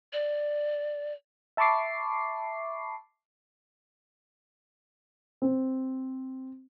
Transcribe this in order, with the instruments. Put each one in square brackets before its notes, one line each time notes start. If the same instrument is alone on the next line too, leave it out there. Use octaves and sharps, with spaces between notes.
[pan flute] D5
[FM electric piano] E5 A5 B5 C#6 D6 C7
[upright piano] C4